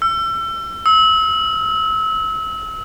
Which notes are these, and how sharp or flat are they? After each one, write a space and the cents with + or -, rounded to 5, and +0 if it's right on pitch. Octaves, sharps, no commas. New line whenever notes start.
E6 +30
E6 -30